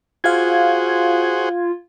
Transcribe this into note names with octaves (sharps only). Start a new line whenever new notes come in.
F4 F#4 G#4 C5 F5 G#6